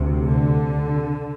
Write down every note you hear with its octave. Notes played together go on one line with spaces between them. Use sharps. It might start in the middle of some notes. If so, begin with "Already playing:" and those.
Already playing: D2 C3
D3